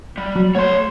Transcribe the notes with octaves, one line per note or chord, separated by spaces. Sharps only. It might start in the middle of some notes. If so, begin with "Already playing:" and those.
G3
F#3
A3 C#5 F#5 C6